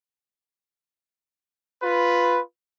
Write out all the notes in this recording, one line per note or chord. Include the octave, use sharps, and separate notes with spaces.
F4 B4